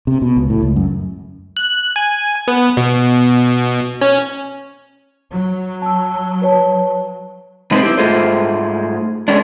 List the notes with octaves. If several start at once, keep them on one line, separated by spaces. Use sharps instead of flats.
C3
B2
C#2
A2
C#2
F#2
F#6
G#5
B3
B2
C#4
F#3
A5 E6
B4 C#5 A5
B2 G#3 C4 D#4 B4 C5
E4 G4
G#2 G#3 A3 F4 G#4 C5
G#3 C#4 D4